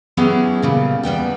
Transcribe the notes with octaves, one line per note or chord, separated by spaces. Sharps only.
F#3 B3 C#4 E4 G4 G#4
A#2 C#3 G3
E2 G3 B3 G5